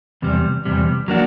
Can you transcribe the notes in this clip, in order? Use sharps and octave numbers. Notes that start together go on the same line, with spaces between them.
E2 C3 G3
E2 C3 G3
F#3 A#3 D4 F#4